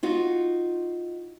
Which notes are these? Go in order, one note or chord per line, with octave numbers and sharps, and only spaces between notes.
D#4 F4 F#4